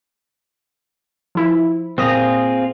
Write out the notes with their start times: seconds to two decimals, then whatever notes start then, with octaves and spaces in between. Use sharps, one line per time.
1.35 F3 E4
1.98 A#2 C4 F4 G#4 D#6 A#6